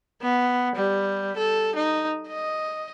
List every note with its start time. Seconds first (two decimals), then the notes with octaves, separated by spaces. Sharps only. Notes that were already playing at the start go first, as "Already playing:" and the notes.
0.22 B3
0.75 G3
1.37 A4
1.76 D#4
2.28 D#5